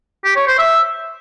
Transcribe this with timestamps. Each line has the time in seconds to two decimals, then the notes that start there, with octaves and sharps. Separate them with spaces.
0.25 G4
0.36 C#5
0.47 C5
0.59 E5